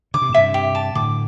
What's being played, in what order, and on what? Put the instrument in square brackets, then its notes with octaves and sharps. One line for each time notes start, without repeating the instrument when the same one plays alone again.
[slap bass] D3 [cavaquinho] D6
[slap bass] C3
A2
[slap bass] G2 C3 [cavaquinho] E5
[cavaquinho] G4
A5
[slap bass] A2 D3 [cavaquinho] D6